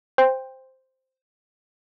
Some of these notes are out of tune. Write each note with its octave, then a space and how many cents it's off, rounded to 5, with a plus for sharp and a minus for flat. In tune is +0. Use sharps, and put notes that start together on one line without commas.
C5 +0 G5 +20